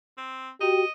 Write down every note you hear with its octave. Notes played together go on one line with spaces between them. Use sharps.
C4
F#4 G4 D#5